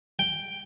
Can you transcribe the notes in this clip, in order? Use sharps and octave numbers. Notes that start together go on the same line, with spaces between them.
G5